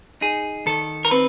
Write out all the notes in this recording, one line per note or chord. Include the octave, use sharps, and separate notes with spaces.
D#4 G#4
D#3 A4
A#4
C4 B4